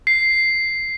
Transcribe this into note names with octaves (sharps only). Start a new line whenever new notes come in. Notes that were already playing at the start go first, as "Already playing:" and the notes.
C7